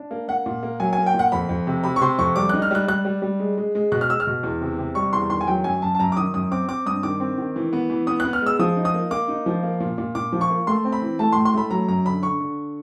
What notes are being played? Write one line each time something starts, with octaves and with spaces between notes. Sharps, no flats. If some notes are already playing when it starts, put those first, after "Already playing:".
Already playing: D4
A#3
A#3 F#5
A#2
A#3
F#3 G#5
A#3 G#5
G5
A#2
F#5
F2 B5
F2
C3
C3 B5
C#6
C3 C6
F2 C#6
G3 D6
D#4 F#6
F6
G3 F#6
G3 F#6
G3
G3
G#3
G#3
G#3
B2 F#6
F6
G#3 E6
F6
B2
E2
C3
C3
G3 C#6
E2 C6
D#3 C6
G#5
F#3 G5
F#2 G#5
F#2 A5
A5
F#2 A#5
D6
D#3 D#6
F#2 D#6
C4 D6
C4 D6
G2 D#6
D#3 D6
C4
D#3
E3
B3
E3
B3 D#6
F#6
B3
F6
G#3 E6
F3 D#6
D#4
D#6
A#3
A#3 D6
D#4
F3
A#3
A#2
A#2
A#2 D6
F3
C#6
A#3
A3 C6
C4
B5
E3
A3 A5
A2 C6
C6
A3 B5
F#3 A#5
F#2 A#5
D3 B5
D3 C#6
D3